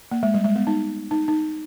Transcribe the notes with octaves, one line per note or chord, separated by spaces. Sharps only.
A#3
G#3
G3
G#3
B3
D#4
D#4
D#4